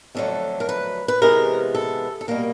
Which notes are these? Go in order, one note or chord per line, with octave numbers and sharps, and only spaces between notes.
F2 D3 F#3 A3 A4
A#4
B4
B4
C3 E3 G#3 B3 A#4
A4
A4
B2 G3 A#3 A#4